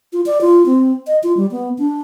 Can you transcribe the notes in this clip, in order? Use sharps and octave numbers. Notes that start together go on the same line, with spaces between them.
F4
D5
F4
C4
D#5
F4
G3
B3
D4